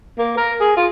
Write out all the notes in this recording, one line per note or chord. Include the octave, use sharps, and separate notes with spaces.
A#3
A#4
G#4
F4